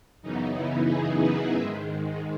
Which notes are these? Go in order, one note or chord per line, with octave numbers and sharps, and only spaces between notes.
F#2 C#3 E3 B3 D#4
E4
G#4
B4
G#2 D#3 G#3 E5